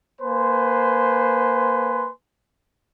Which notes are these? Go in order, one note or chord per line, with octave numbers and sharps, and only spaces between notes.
A#3 B4 C5 G#5 C6